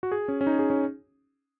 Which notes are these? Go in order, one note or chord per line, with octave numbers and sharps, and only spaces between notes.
F#4
G#4
C#4
C#4
D#4
G#4
C#4